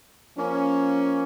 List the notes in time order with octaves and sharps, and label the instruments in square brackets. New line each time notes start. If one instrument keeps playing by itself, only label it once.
[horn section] F3 A#3 C#4